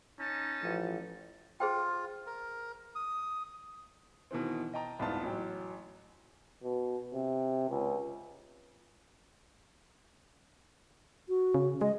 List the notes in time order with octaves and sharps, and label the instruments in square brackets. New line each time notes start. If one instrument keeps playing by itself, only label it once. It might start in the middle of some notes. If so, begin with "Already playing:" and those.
[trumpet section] C#4 D#4 A5
[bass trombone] A1 [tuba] F3
[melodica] F4 [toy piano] G#4 C5 G5
[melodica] A#4
D#6
[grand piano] B2 D#3 E3 C4
D#5 G5 A5 A#5
F#1 C2 G#2 B3 F4 A5
A1 F#3 G5
[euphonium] B2
C3
C#2
[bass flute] F#4
[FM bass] C#3
[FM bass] G#3 [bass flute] D#5